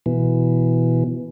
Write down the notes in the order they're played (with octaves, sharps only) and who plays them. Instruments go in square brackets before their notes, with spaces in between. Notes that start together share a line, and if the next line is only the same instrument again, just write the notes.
[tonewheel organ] B2 E3